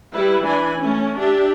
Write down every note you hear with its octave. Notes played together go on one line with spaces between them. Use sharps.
G3 E4 B4
E3 D4 G#5 B5
A3 C#4
D4 G4 E5